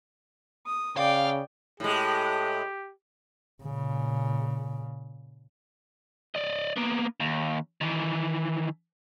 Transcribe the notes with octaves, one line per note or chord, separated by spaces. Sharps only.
D#6
C#3 D5 F5 G5
A2 G#3 G4
A#2 C#3
D5 D#5
A#3 B3
D#2
D#3 E3